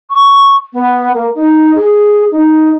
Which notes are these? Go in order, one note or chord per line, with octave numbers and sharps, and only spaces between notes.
C#6
B3
A#3
D#4
G#4
D#4